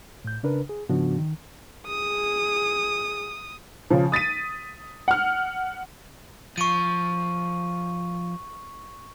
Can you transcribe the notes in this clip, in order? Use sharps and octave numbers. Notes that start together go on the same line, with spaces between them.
A2 G6
C#3 D4 A#4 B4
G#4
G#2 C#3 F3 B3 D4 F#4
D#3
G#4 D#6
C#3 F3
D#6 A6 B6 D#7
F#5 F6
F3 C#6 D#7